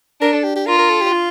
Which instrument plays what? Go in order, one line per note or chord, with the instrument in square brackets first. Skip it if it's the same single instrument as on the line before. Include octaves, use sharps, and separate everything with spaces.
[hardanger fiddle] D4 [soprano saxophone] A#4
[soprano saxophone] A4
G4
G4
[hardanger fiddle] F4 [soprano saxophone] A#4
[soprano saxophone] A#4
A4
G4
F4